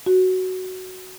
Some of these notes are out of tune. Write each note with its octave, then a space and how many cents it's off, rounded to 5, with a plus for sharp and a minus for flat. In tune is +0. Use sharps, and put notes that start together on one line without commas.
F#4 +5